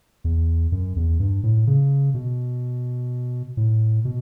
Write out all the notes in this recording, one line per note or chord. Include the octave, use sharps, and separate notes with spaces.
E2
F#2
E2
G2
A2
C#3
B2
A2
B2